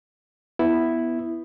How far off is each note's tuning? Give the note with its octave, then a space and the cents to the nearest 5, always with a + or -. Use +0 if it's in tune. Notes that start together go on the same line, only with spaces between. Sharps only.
B3 +0 E4 +0